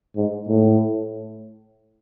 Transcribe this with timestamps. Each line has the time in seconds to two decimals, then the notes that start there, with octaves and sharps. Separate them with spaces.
0.16 G#2
0.49 A2